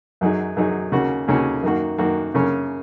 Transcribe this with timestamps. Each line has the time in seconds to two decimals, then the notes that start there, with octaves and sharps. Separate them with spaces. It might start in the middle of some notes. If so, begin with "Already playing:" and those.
0.21 F#2 F#3 D#4 G#4
0.57 F#2 F#3 D#4 G#4
0.92 D#2 C#3 A#3 C#4 F#4
1.28 D#2 C#3 A#3 C#4 F#4
1.63 F#2 D#3 A#3 F#4
1.98 F#2 D#3 A#3 F#4
2.34 F#2 C#3 A#3 C#4